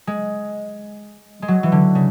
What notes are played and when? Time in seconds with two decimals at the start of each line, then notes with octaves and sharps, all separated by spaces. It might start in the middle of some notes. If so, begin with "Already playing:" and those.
0.07 G#3
1.42 G#3
1.48 F#3
1.63 E3
1.72 D3
1.95 C#3